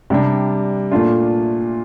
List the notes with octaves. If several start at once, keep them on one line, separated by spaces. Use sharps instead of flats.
C3 G3 D4
A#2 A3 D4 F4